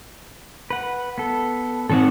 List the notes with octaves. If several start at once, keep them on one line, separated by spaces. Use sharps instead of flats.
B4 F#5
B3 A4
G#2 D#3 C4 A4 C#5 F#5